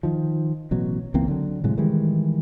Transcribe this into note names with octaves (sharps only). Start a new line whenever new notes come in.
D#3 F3
A1 B2 F#3
C#2 E3 A#3 C4
D3 F#3
A2 C3 F#3 G#3
D#3 E3 G3 G#3